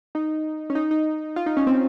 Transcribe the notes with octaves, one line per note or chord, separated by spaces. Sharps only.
D#4
C#4
D#4
D#4
F4
D#4
C#4
C4